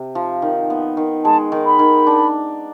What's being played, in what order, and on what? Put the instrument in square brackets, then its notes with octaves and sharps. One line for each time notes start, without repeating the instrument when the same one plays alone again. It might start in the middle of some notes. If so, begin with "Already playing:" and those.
Already playing: [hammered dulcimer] C3
F3
D#3
B3
D#3
[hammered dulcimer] G#3 [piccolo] A5
[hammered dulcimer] D#3
[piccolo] B5
[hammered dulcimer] D#3
D4